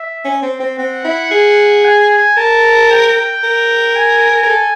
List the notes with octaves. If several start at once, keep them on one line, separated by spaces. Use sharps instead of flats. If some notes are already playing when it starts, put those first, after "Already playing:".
Already playing: E5
C#4
C4
C4
C4 F#5
E4
G#4
G#5
A#4 A5
G5
A#4
G#5
A#4
A4